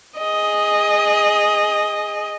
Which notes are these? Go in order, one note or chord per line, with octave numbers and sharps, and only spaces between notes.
G#4 D#5